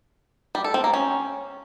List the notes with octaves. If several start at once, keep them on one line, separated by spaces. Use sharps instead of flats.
G3
A4
C4
A#3
C#4